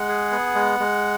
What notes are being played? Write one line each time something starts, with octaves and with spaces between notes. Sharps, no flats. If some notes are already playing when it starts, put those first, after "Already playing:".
Already playing: G#3 F#5
G#4
B3
G#3
G#3